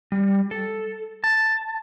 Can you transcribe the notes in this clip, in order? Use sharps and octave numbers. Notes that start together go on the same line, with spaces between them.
G3
A4
A5